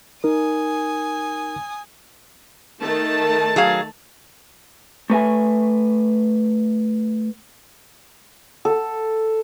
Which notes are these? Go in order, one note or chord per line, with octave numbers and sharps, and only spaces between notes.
D#4 A#4 G#5 D#6
D#3 A3 A5
F#3 G#4 F5
A3 B4 E5 G#5
A4